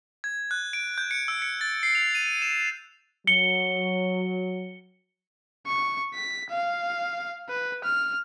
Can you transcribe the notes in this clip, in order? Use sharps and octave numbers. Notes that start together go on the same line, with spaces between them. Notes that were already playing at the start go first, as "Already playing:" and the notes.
G#6
F#6
D7
G6
C#7
E6
C#7
A6
C7
F7
D#7
E7
F#3 C#7 G7
C#6
B6
F5
B4
F6